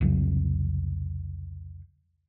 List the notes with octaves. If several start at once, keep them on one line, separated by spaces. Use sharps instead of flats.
C2 F2 C#3 F#3